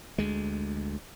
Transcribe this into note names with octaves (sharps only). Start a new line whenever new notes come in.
D2 G#3